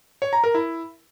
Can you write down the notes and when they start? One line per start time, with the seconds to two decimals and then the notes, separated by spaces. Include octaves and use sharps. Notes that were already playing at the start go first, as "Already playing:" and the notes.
0.22 C#5
0.33 A#5
0.44 A#4
0.54 E4